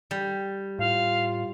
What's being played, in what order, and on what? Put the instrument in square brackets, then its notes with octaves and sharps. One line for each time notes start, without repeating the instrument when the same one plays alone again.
[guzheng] G3
[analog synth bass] A2 [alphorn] F4 [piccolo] F5